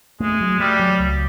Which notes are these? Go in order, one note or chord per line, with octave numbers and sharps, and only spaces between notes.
G#3 A3
F#3
G3 A3
F#3
C#2